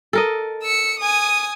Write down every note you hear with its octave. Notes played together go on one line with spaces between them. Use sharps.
A4 A#4 D#5
E6 C#7
G#5 D#6